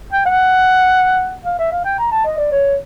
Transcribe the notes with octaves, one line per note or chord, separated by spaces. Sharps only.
G5
F#5
F5
E5
F5
G5
A#5
A5
D#5
D5
C#5